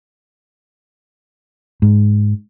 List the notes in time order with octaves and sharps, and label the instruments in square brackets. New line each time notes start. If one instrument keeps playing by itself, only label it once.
[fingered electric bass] G#2